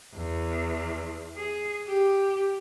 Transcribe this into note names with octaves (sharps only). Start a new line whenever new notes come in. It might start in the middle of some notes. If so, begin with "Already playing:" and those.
E2
G#4
G4